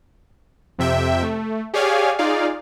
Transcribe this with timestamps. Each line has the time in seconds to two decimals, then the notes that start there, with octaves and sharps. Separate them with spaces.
0.79 F2 C3 E5 G5
1.22 A3
1.74 G4 G#4 C#5 D5 F5 G#5
2.19 D#4 F4 G#4 D5 F5